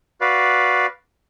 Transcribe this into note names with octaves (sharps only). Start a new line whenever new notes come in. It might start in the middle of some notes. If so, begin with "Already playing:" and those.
F#4 B4 D5 F5